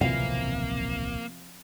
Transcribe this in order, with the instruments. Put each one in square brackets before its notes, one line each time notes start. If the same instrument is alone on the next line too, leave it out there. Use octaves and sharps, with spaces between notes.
[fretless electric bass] D1 B1 E3 [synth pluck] C3 F3 C4 [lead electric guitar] A#3 [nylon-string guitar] F5